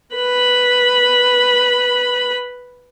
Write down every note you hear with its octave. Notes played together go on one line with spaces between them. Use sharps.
B4 B5